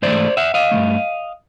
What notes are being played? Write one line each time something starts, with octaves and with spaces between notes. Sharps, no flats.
G#2 E3 A3 C5 D5
E5 F#5
D#5 F5
G2 E3 A3